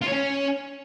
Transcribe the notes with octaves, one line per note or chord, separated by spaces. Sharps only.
F4
C#5
C#4